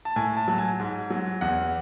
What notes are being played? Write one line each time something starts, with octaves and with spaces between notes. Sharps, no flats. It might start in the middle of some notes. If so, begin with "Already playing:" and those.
A5
A2 G#5
A5
F#3 A5
G#5
G#2
F#3
E2 F#5